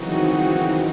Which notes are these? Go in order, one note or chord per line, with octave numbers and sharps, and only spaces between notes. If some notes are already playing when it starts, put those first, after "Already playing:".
Already playing: C#3 E3 F#3 C4 D#4 F#4
D#3
E3
D#3